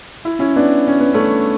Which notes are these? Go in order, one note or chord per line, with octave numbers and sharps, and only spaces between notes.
E4
C#4 E4
B3 D4
C#4
B3
A3 C#4